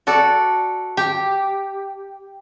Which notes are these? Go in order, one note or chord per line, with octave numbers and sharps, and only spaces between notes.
F#4 A4 D5
G4